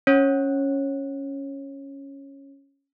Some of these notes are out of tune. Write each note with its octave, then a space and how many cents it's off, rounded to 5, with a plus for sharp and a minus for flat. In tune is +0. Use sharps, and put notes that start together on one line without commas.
C#4 +0 C#5 -25